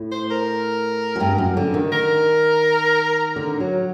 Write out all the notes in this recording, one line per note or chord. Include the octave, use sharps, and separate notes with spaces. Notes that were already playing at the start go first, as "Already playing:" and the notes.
Already playing: A2
C5
A#4
F#2
G2
F#2
D3
D#3
A#4
D3
F#3